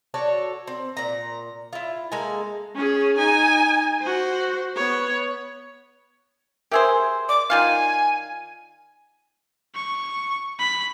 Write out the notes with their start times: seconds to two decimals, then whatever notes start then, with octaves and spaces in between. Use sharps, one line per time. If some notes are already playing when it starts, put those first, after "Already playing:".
0.14 F#4 A4 C#5 D5
0.67 C4
0.97 A#2 A#5
1.73 E4 F4
2.12 G#3 A#3 A4 G#5
2.76 C#4 G#4
3.17 D#4 G#5
4.02 F#4 C5
4.76 B3 C#5
6.71 G4 G#4 A#4 C5 E5 E6
7.29 D5 D6
7.50 D#3 F4 F5 G#5
9.75 C#6
10.59 B5